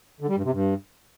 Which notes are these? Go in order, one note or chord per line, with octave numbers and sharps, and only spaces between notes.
D3
G3
G2
C3
G2